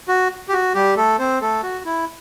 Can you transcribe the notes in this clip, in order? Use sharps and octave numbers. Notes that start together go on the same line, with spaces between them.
F#4
G4
F#4
G3 G4
A3 A4
C4 C5
A3 A4
F#4
E4